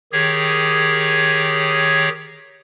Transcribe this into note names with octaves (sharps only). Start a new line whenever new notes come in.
D#3 G4 G#4 C#5 G#6